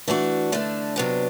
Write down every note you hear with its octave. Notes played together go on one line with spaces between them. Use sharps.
E3 A3 D4 F#4
D3 A3 D4
C3 F#3 B3 D4